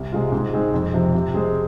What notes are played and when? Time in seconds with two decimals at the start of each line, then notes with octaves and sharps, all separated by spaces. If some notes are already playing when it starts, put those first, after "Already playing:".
Already playing: C2
0.12 C3 G#3 F4
0.32 G#2
0.53 G#3 C4 D#4
0.74 F2
0.94 C3 F3
1.14 C3
1.34 G#3 C4 G#4 C5